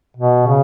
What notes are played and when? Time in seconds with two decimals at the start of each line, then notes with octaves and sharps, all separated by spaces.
0.17 B2
0.47 C#3